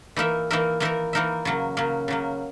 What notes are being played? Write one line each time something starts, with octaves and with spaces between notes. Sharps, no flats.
E3 A#3 D#4 A#4 E5
E3 A#3 D#4 A#4 E5
E3 A#3 D#4 A#4 E5
E3 A#3 D#4 A#4 E5
C#3 F#3 A#3
C#3 F#3 A#3
C#3 F#3 A#3